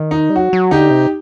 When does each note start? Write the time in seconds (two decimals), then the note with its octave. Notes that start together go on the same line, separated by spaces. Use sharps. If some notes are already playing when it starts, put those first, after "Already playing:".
Already playing: D#3
0.11 D#4
0.30 G3
0.35 F#3 F#4
0.53 F#3
0.71 D3 D#4 G4
0.90 C3